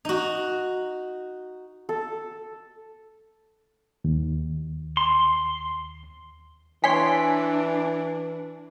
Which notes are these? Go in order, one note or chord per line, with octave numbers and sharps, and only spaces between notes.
D#4 F#4
A4
D#2
C6
E3 D4 C#5 G#5 C6 B6